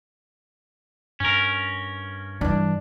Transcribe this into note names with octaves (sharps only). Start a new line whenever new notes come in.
G2 C#4 A#4
G2 E3 D4